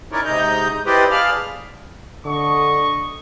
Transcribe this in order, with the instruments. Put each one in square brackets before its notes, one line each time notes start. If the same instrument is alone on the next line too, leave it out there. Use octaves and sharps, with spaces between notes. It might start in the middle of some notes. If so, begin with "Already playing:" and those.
[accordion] C#4 D#4 E4 A#4 C#5 D5
G#2 C3 D#4 D#5 A#5 G6
E4 G4 B4 C5 D5 D#5
G#4 D5 F5 A5 B5 F6
[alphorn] D3 [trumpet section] D#5 C#6